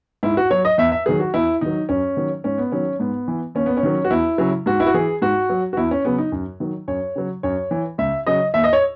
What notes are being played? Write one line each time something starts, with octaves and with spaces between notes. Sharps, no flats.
G#2 E4
F#4
F#3 C#5
D#5
E2 E5
E5
D#3 F#3 G#4
F#4
E2 E4
D#3 F#3 D#4
F#2 C#4
D#3 F#3
G#2 C#4
B3
D#3 F#3 C#4
G#2 B3
E3
D#2 C#4
B3
C#4
D#3 F#3
F#4
E2 E4
C#3 F#3
G#2 F#4
E4
F#4
E3 G#4
G#2 F#4
F#3
F#4
E2 E4
C#4
C#3 F#3 B3
D#4
F#2
D#3 F#3
F#2 C#5
C#3 F#3
F#2 C#5
E3
C#2 E5
C#3 F#3 D#5
D#2 E5
D#5
C#5